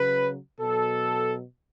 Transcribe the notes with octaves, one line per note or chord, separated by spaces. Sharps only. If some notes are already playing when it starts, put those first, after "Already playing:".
Already playing: C#3 F#3 B4
B2 F#3 A4